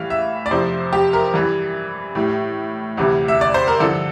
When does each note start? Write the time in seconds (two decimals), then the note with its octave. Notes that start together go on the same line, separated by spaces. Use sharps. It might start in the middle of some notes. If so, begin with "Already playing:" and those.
Already playing: A2 E3 G3 F5
0.10 E5
0.46 D5
0.51 F2 C3 F3 C5
0.93 G4
1.13 A#4
1.34 G2 E3 G3
2.15 A2 G3
2.97 D2 C3 E3 G3
3.28 E5
3.41 D5
3.54 C5
3.68 A#4
3.80 G2 D3 F3 A4